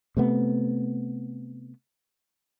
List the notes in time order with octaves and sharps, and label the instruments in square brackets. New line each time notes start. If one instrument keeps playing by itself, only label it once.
[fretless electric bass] C3 A3 B3